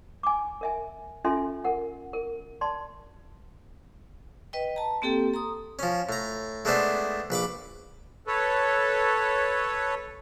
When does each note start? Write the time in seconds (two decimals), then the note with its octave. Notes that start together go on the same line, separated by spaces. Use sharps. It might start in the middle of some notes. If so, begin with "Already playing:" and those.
0.23 G#5 D6
0.61 A#4 E5 G#5
1.24 C#4 F4 A4 E5 G#5 C6
1.64 A#4 F#5
2.13 A#4
2.61 D5 A5 C6
4.53 B4 D#5 G5
4.76 A5 A#5
5.02 A#3 C4 G4 A4 G5
5.34 A#5 C6 D#6
5.79 F3 C#4
6.09 A2 A#5
6.65 G#3 A3 B3 D4 C5
7.30 A#1 B4 B5 D6
8.27 A4 B4 C#5